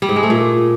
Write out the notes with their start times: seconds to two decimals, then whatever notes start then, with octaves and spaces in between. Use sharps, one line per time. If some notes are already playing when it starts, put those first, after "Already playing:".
0.02 G3
0.09 G#2
0.16 G#3
0.23 A3
0.30 A#2